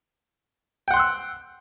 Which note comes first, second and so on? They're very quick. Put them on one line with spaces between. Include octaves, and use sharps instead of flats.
G5 F#5 C6 F#6 E6